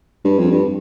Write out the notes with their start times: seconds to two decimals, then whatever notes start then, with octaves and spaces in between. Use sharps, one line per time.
0.24 G2
0.38 F2
0.51 G2